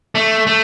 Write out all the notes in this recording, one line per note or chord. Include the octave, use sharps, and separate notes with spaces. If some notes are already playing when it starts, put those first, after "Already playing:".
A3
A3